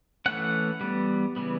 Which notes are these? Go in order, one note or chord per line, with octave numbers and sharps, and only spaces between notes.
E3 A3 C#4 F#5
E3 G3 B3
C#3 E3 G3 B3